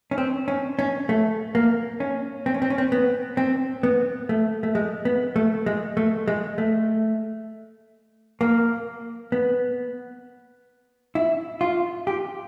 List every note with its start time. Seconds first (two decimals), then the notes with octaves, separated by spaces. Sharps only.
0.11 C#4
0.18 C4
0.48 C#4
0.79 C#4
1.09 A3
1.55 A#3
2.00 C#4
2.46 C4
2.54 C#4
2.62 C4
2.70 C#4
2.78 C4
2.92 B3
3.37 C4
3.83 B3
4.29 A3
4.63 A3
4.75 G#3
5.05 B3
5.36 A3
5.66 G#3
5.97 A3
6.28 G#3
6.58 A3
8.41 A#3
9.32 B3
11.15 E4
11.61 F4
12.07 G4